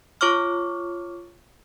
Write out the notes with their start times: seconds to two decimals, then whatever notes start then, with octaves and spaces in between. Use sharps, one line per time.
0.21 F4 C#5 C#6 D6 F6